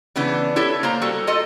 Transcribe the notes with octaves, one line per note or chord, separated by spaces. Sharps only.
C#3 E3 B3 D4
E4 G4 A4 C#5
A#3 C5 A#5
G3 F#4 A4
F4 A4 D#5